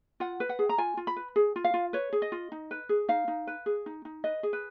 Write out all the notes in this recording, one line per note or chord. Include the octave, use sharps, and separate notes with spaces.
F4 F#5
B4
F#5
G#4
A#5
F4 G#5
F4
B5
B4
G#4
F4
F5
F4
B4 C#5
G#4
D#5
F4
D#4
B4
G#4
D#4 F5
D#4
B4
G#4
D#4
D#4
B4 D#5
G#4
B4